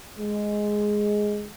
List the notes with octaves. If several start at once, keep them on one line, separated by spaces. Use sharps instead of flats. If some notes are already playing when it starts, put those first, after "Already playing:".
G#3